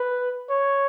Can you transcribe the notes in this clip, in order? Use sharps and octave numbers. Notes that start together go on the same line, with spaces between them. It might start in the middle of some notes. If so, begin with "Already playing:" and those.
Already playing: B4
C#5